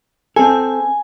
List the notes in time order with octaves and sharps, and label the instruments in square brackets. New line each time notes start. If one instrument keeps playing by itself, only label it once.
[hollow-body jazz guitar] C4 A4 [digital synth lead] G#5